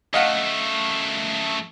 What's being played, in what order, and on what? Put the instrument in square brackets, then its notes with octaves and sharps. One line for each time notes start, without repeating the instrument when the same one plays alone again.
[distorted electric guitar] F#2 A3 [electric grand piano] D#5 F5 F#5